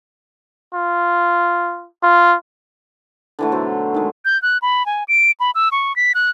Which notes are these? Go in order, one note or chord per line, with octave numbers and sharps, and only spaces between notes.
F4
F4
D3 E3 A3
B2 F#3 A4 C5
D#3 G#3
G6
F#6
B5
G#5
D7
B5
E6
C#6
B6
F#6